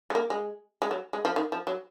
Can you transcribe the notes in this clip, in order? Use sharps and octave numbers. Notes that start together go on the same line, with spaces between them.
G#3
A#3
G#3
G#3
F#3
G#3
F3
D#3
F3
F#3